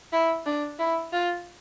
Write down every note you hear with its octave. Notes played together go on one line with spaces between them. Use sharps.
E4
D4
E4
F4